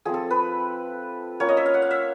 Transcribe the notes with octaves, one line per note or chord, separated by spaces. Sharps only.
F3 A3 C4 G#4
A4
B4
A#3 C#4 F4 C#5
D#5
E5
F5
F#5
F5
E5